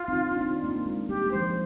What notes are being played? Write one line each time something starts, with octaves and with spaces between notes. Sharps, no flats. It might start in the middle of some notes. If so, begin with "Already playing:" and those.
Already playing: F4
C4 D#4
D4
C4 D#4
A#3 D4
G#3 C4
G3 A#3 G4
G#3
F3 C5
G3